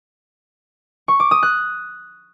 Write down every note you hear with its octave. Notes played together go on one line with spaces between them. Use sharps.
C#6
D6
D#6
F#6